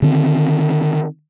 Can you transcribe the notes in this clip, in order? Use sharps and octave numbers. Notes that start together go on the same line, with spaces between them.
D3 D#3 C4